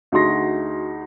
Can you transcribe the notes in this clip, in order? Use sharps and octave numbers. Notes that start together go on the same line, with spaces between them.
D2 D#4 F#4 G#4 C6 A#6